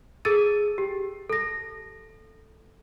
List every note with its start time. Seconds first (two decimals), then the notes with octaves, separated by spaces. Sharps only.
0.25 G#4 A4 E6 A6 D#7
0.78 G4
1.30 A4 A#6